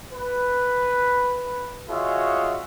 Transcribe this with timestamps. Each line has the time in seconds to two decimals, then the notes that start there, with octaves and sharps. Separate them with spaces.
0.13 B4
1.89 F4 F#4 G#4 C#5 D#5 E5